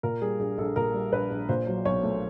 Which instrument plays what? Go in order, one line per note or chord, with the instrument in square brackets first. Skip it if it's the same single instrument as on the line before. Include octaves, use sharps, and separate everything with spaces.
[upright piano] A#2 A#4
G3 G#4
A#1 G#4
A#1 A4
A#2 A#4
G3
A#1 B4
A#1
A#2 C5
F#3
B1 C#5
A3